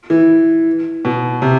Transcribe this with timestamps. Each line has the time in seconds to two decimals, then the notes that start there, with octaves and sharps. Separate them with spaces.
0.10 E3
1.05 B2
1.42 C3